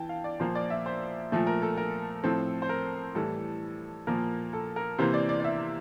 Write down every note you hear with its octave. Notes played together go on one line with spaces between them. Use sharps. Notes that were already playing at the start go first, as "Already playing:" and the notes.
Already playing: E3 G5 A5
F5
D5
A#2 F3 A#3 C5
D5
E5
C5
A#2 F3 A3
A#4
A4
A#4
A2 F3 C4 A4
C5
A#4
A2 E3 G3 A4
A#2 F3 A#3 A#4
A4
A#4
C3 E3 A#3 C5
D5
D5
D5
E5